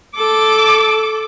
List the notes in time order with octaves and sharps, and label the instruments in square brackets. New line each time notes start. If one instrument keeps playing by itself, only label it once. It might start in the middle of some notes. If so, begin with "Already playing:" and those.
[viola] A4 D6